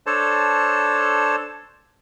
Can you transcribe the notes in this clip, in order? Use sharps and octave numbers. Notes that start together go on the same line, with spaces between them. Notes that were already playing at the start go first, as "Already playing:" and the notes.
D4 A4 C5 C#5 A5